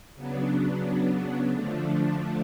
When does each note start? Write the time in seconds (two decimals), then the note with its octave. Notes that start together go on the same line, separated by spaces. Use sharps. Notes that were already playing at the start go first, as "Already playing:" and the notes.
0.15 C#3 F#3 B3 D4
1.51 D3 F3 A3 D4